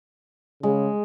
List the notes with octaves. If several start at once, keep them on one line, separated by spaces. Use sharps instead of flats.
C#3 G#3